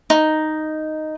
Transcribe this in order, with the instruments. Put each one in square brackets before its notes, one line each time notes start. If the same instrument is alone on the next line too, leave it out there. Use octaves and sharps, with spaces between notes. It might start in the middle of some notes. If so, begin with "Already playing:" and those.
[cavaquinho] D#4